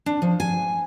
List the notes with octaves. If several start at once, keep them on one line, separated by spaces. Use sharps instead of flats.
D4
F3
G#5